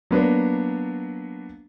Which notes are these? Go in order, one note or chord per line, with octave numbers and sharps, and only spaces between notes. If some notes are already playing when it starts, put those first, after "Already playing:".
F#3 A#3 B3 D4